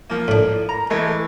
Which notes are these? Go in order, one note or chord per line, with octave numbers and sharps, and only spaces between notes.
F3 A#3
A2 D4
A#5
E3 G#3 A3